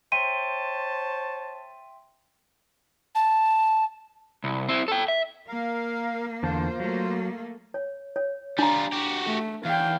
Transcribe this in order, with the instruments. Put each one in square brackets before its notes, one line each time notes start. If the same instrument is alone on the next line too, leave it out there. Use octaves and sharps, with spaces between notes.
[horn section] C5 C#5 A5 [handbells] E5 G5 C6 [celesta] D#7
[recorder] A5
[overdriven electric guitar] C2
C4 E4
A4 G5
E5
[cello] A#3 [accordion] A#4 F5
[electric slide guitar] E2 D3 A5 [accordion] F4 C5
[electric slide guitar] F#3 [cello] A3 A#3
[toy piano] C#5
C#5
[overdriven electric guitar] G3 F4 [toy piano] D4 A#5
[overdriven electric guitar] F#4 G4
[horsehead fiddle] A3
[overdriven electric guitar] E2 [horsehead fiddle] F5 G5